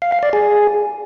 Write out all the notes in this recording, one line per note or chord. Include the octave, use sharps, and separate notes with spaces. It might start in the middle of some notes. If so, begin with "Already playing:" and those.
F5
F5
D5
G#4